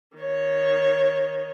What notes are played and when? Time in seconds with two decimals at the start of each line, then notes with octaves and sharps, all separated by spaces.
0.17 D#3 C#5